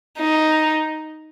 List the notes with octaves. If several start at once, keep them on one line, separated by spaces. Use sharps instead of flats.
D#4